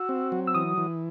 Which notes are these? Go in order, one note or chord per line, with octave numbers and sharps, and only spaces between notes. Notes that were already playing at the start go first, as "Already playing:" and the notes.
Already playing: F#4 E6
C4
F#3
E6
E3 D#6
E3